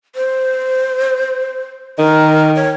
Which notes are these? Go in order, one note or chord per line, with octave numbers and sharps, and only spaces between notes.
C5
D#3 A#4
C#5